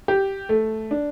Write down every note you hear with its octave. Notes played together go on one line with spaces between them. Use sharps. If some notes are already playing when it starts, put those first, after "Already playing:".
G4
A3
D4